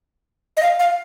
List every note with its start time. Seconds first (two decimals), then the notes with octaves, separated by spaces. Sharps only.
0.57 D#5
0.63 F5
0.80 F5